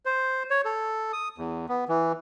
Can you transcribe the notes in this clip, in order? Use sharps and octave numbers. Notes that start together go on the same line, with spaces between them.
C5
C#5
A4
D#6
E2
B3
E3